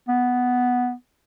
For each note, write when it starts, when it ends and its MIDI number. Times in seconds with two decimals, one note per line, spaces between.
0.08 0.93 59